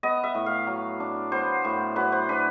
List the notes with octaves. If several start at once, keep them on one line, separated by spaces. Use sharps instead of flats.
B3 D#5
E5
A2
F5
F#3
D4
B3 C5
A2
F#3 B4
C5
D4 B4